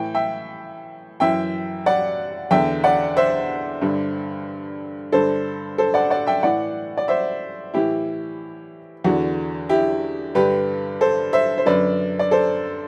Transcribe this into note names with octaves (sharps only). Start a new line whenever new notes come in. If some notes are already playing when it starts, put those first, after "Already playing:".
Already playing: A2 E3 G5
E5 G5
F#2 E3 E5 G5
D5 F#5
E2 D3 E5 G5
D5 F#5
C5 E5
G2 D3
G2 D3 A4 C5
A4 C5
D5 F#5
D5 F#5
E5 G5
A2 E3 D5 F#5
D5
C5 E5
A2 E3 E4 G4
E2 D3 F#4
E4 G4
G2 D3 G4 B4
A4 C5
C5 E5
C5
F#2 D3 B4 D5
D5
A4 C5